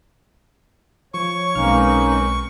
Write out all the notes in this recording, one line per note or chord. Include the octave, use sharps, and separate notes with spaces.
F3 C#5 C#6
B1 G#3 A#3 C4 C#4 D#4 B4 F6